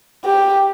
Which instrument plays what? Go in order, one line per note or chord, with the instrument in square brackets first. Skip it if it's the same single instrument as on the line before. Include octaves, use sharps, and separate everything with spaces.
[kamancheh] G4